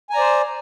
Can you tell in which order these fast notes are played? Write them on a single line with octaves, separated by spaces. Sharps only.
G#5 A#5 D5 C5